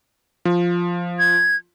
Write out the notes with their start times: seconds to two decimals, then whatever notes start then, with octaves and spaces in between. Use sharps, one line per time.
0.45 F3
1.19 G#6